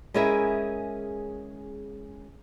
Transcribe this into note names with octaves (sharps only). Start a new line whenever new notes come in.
G#3 C#4 E4 G#4 A#4 E5